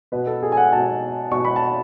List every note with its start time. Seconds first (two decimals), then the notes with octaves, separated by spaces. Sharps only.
0.12 B2 B4
0.27 A4
0.42 G#4
0.52 G#5
0.57 F#5
0.72 B2 A5
1.32 B2 C#6
1.45 B5
1.56 A5